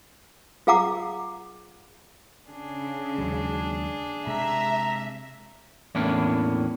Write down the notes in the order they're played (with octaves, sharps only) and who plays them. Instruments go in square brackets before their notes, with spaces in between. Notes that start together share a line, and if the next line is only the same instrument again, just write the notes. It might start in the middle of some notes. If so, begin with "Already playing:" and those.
[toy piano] F4 G#4 F5 F#5 A#5 D6
[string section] C#3 [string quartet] D4 G#4
[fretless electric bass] D#2 F#3 G#3
[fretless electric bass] C3 G#3 [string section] E5 [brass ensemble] A#5
[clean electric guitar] E2 A2 E3 A#3 C#4 D4